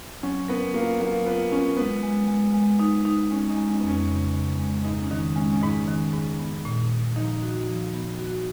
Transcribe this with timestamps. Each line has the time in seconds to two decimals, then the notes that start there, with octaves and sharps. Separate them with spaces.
0.23 F#3 C#4
0.48 B3 A#4
0.74 A#3 F4
1.00 F#3 A#3
1.26 B3 F4
1.51 C#4 F4
1.77 G#3 B3
2.03 G#3
2.28 G#3
2.54 G#3
2.79 D#4
3.05 D#4
3.31 G#3 C#4
3.50 D#4
3.57 G#3
3.70 C#4
3.80 F2 B3
3.88 C#4
4.08 C#3
4.33 C#3
4.59 G#3
4.85 G#2 D#4
5.02 C#4
5.11 D#3 D#4
5.36 G#3 C#4
5.53 C#4
5.62 G#2 D#4
5.88 D#3
6.13 G#2
6.39 B3
6.65 A#2
6.90 A#2
7.16 F3 D#4
7.42 F#4
7.68 F3
7.94 B3
8.19 F#4